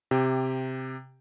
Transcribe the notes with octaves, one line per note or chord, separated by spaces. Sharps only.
C3 G4